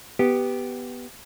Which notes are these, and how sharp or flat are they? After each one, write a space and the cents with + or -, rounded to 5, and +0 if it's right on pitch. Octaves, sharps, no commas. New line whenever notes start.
B3 +0 G4 +0